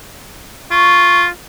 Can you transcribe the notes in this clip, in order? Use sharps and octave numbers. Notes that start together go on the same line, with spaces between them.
F4 C#6